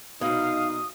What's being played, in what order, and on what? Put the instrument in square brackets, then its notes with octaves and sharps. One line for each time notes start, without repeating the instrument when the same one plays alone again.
[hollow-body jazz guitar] C2 B2 [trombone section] D#4 [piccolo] F5 [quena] D#6